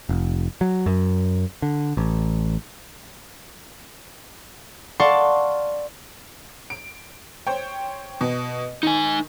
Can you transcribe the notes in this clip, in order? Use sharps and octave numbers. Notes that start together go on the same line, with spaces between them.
F1
F#3
F#2
D3
A1
D5 F5 F#5 A5 C6 C#6
D7
C5 C#5 G5
B2
D#3 D#4 G#5